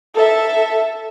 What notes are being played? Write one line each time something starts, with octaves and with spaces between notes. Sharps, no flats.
A4 E5